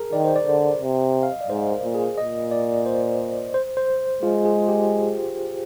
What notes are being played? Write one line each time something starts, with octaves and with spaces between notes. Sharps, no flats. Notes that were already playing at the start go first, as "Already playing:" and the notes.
Already playing: G#4 A#4
D#3 D5
C5
D5
D3
C3
F5
D#5
D5
G#2 C5
A#4
A#2
G#4
A#2 D#5
D5
C5
C5
C5
G#3 F4
G#4
G4